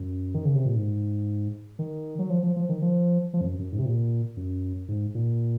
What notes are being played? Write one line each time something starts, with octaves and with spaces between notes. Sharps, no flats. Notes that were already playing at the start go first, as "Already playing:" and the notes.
Already playing: F#2
D#3
C#3
C3
A#2
G#2
D#3
F#3
F3
F3
F3
D#3
F3
F3
F2
F#2
F#2
G#2
C3
A#2
F#2
G#2
A#2